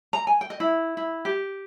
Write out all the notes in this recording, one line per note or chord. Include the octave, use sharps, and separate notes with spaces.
A#5
G#5
G5
D#5
E4
E4
G4